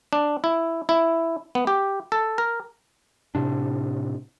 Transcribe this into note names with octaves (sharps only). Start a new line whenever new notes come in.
D4
E4
E4
B3
G4
A4
A#4
A2 C3 D4